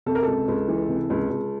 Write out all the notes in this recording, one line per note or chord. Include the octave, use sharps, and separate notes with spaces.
C3 A4
A#4
C#2 A4
C#2
E3
C3
C#2
C#2